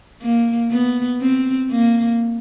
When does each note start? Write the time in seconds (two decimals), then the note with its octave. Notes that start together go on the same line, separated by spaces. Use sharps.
0.22 A#3
0.71 B3
1.21 C4
1.71 A#3